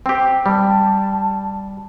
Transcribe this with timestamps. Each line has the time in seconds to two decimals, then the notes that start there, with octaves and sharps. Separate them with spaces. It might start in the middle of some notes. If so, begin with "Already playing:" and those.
0.06 C4 G4
0.46 G3 A5